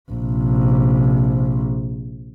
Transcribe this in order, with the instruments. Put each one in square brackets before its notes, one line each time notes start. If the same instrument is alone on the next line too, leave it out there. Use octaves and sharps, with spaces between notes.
[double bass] A#1 C3